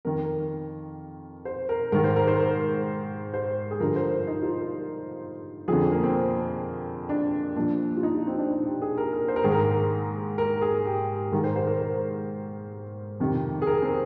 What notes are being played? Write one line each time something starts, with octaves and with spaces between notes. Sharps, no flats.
F2 D#3 A#4
C5
A#4
G#2 D#3 A#4
C5
A#4
C5
A#4
C5
G#4
G2 D3 F3 A#4
C5
A#4
D#4
F4
A#4
F2 D3 F3 G#4
A#3
C4
D4
A#2 F3 D4
F4
D#4
F4
C4
D4
D#4
G4
G#4
A#4
A#4
C5
A#4
G#2 D#3 G#4
A#4
A#4
G#4
G4
G#2 D#3 A#4
C5
C5
A#4
C5
F2 C3 D#3
G#4
A#4
C4